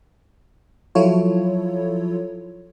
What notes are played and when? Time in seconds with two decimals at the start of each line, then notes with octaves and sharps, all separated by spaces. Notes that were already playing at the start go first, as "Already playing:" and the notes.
0.95 F3 F#3 E4 F4 A4 C#5